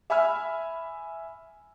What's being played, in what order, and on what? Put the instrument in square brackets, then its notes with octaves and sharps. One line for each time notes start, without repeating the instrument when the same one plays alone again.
[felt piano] E5 G#5 B5 E6 F6